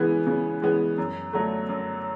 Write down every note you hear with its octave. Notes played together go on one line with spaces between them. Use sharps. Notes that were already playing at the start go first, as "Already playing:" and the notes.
Already playing: C#3 E3 G#3 B3 G#5
C#3
E3 G#3 B3
F#2
D3 F#3 A3
F#2